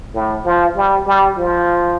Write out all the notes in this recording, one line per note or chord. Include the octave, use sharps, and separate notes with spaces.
A2
F3
G3
G3
F3